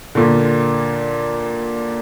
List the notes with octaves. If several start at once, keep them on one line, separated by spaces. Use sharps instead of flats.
A#2 D3